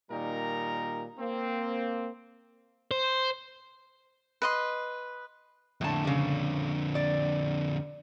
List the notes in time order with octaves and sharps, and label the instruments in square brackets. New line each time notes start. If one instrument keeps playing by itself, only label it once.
[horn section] A#2 D#3 G3 D#4 A#4 A#5
A#3 C4
[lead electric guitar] C5
[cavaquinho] B4 D#5 C6
[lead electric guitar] F2 D3 [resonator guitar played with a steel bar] A2 A5
[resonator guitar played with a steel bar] C#3 G3
D5